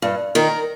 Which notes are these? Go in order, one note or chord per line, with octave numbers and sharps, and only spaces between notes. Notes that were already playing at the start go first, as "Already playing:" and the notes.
G2
D#3 A#4